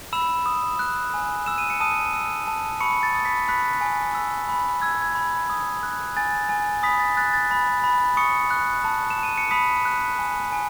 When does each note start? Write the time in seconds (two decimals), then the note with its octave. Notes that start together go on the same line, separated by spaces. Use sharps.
0.13 B5 E6 E7
0.46 D#6
0.79 F#6
1.14 G#5
1.46 E6 E7
1.58 D#7
1.70 C#7
1.80 A5 D#6 D#7
2.13 E6
2.48 A5
2.80 B5 C#6 C#7
3.03 A6
3.14 D#6
3.25 B5 B6
3.48 B5 F#6 B6
3.81 G#5
4.15 E6
4.49 B5
4.82 E6 G#6
5.02 G#6
5.15 B5
5.50 D#6
5.83 F#6
6.17 G#5 A6
6.49 G#5
6.83 B5 D#6 B6
6.99 A6
7.17 F#6 A6
7.34 A6
7.51 B5
7.84 B5
8.17 C#6 D#6 C#7
8.51 F#6
8.84 A5
9.10 E7
9.18 A5 D#7
9.38 C#7
9.51 B5 D#6 B6
9.85 F#6
10.19 G#5
10.52 G#5